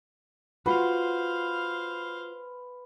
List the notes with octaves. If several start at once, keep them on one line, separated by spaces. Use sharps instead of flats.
F4 F#4 B4 C5 F5